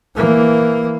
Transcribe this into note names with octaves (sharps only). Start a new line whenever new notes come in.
E3 A#3